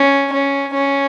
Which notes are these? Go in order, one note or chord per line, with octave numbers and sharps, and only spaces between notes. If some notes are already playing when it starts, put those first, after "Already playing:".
Already playing: C#4
C#4
C#4